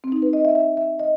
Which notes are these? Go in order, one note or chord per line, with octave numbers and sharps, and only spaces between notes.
C4
D#4
B4
D#5
E5
E5
E5
D#5